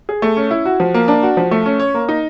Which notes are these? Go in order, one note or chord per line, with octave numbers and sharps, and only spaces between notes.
G#4
A3
C#4
E4
F#4
F3
A#3
D4
F#4
F3
A3
C#4
C#5
A#3
D#4